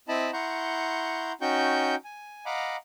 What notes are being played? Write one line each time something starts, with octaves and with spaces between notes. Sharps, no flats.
C4 E4 D#5 A5 B5
E4 F#5 A#5 C6 C#6 G6
C#4 D#4 F#4 G5 C#6 G6
G#5
D#5 F5 F#5 A#5 B5 D6